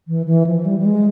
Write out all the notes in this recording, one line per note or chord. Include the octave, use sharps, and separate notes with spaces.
E3
E3
F3
G3
G3
G#3